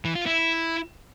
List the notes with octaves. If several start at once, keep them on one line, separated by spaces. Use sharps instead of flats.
E3
F4
E4